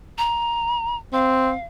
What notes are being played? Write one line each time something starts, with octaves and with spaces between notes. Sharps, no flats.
A#5
C4 F5